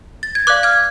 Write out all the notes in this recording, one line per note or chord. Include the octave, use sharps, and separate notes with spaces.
A6
G#6
B4 D5 F5 D6 F#6
F6 G#6